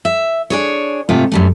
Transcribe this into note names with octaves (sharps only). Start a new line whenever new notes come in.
E5
D4 G#4 C#5
G#2 C3 A3 F4
F#2 G3 A3